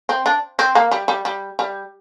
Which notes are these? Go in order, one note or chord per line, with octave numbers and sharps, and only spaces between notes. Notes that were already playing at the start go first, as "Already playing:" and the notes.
C4
D4
C4
A#3
G3
G3
G3
G3